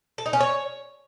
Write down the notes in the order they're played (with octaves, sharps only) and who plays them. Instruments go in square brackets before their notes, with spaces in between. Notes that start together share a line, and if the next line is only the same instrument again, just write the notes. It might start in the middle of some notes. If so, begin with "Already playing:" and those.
[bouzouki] A4
D#4
C#4
C#5